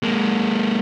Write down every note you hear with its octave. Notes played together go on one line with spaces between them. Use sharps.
G#3 A#3